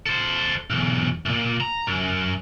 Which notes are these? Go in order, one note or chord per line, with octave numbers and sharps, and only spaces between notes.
A4 C5
B1 E2
F#2 A#2
A#5
F#2